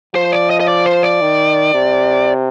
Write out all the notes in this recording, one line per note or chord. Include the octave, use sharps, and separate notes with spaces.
F3 C5
D5
D#5
D#5
D5
C5
D5
D#3
C3